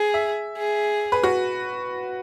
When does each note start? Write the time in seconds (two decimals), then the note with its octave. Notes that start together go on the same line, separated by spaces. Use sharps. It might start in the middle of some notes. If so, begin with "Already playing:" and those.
Already playing: G#4
0.14 E5
0.57 G#4
1.12 B4
1.23 F#4